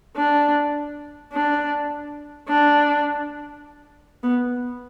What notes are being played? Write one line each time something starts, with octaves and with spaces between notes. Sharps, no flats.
D4
D4
D4
B3